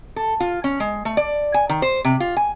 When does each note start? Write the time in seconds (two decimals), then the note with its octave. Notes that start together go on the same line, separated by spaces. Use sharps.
0.16 A4
0.40 F4
0.64 C#4
0.80 G#3
1.05 A3
1.17 D5
1.54 G#5
1.69 D#3
1.82 C5
2.05 C3
2.20 F4
2.37 G#5